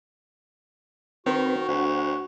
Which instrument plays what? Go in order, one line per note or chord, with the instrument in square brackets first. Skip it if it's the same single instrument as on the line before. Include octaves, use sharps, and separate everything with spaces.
[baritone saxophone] D#3 [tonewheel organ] C4 B4 C5 [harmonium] F#4
[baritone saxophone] D2 [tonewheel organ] C5 F#5